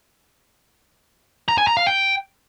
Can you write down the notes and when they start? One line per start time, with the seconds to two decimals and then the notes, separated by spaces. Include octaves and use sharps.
1.48 A#5
1.58 G#5
1.67 A#5
1.77 F5
1.86 G5